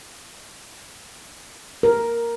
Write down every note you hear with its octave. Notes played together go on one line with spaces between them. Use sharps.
A#4